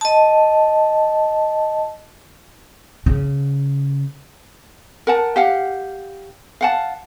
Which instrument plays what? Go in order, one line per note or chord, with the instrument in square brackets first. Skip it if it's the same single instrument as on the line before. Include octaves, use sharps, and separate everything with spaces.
[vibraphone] D#5 A5
[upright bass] C#3
[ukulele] A#4 F#5 A5
G4 F5 F#5
F5 F#5 A5